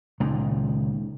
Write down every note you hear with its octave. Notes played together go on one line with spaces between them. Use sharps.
C#2 A#2 D#3